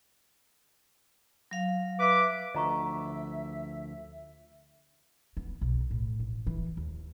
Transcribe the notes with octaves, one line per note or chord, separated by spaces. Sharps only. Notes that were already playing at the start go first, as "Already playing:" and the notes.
F#3 F5
B4 E5 D6
D2 D3 F3 D#5 E5 A#5 C#6
B3
B1
A2
A1
E3
D#2